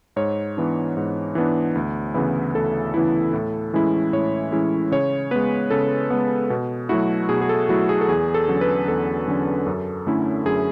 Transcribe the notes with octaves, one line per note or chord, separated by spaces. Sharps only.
G#2 C#5
E3 B3 D4
G#2
E3 B3 D4
D2
C#3 E3 B3 E4
D2 A4
C#3 E3 B3 E4
A2
E3 G#3 C#4 E4
A2 C#5
E3 G#3 C#4 E4
C#3 C#5
G#3 B3 B4
C#3 A4
G#3 B3
B2
F#3 A3 E4 F#4
B2 G#4
G#4
A4
F#3 A3 E4 F#4
G#4
A4
E2 G#4
A4
D3 F#3 C#4
B4
E2 A4
D3 F#3 C#4
F#2
D3 A3 C#4 E4
F#2 G#4